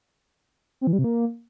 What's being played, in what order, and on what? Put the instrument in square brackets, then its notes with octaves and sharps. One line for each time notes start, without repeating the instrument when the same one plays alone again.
[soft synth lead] C4
E3
G3
C3
A#3